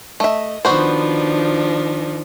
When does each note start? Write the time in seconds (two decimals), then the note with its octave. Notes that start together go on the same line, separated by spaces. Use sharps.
0.20 A3 D#5 E5
0.65 D#3 F3 B3 D4 F#4 C5